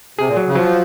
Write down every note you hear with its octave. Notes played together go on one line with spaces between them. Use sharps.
C3 G#4
A#2
F#3
C#3
F3 F#3